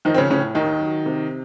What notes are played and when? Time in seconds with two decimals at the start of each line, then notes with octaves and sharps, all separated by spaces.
0.05 D#3 F3 D#4
0.14 C4
0.18 C#3 C#4
0.30 A2 C#3 C#4
0.55 D#2 D#3 D#4
0.81 F#3
1.06 C3